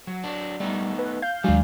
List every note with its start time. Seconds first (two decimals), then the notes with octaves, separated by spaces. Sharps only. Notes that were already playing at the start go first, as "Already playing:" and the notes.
0.07 F#3
0.24 F#3 D4
0.60 G3 A3 B3 D#4
0.99 B4
1.22 F5 G6
1.44 D#2 F#3 G#3 D4 F4